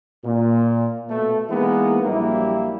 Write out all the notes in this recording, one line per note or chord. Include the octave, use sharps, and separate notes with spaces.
A#2
B2 A3
E3 G#3 A#3 B3 D#4 E4
A#1 F#3 G3 A#3 E4 G4